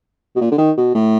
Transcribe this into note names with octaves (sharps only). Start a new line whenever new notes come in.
B2
A#2
D3
D#3
B2
A2